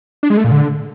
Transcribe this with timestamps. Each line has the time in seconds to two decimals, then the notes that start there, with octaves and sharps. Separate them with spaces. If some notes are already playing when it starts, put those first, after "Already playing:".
0.23 D4
0.30 G#3
0.37 A3
0.44 A#2
0.52 D3